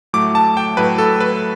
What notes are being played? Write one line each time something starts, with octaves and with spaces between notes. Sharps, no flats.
A2 F#3 A3 D6
A5
G5
A2 F#3 A3 B4
A4
B4